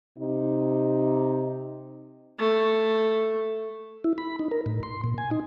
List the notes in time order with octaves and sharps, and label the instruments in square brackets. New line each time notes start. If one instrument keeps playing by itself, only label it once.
[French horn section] C3 D#4
[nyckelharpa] A3
[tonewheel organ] E4
B5
D#4
A#4
A2
C6
A#2
G#5
D#4